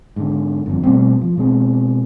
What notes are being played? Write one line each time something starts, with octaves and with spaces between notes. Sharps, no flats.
G#2 D3
G1 F2
B2 G3 A3 C4
F3
B2 G#3 C4